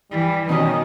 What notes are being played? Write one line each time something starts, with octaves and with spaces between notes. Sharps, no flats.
E3 G3
B2 D#3 C#4 D#4 D#5